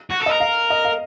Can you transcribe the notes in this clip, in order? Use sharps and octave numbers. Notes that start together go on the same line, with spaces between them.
F#4
A4
A#4 D#5
F5
D#5
F5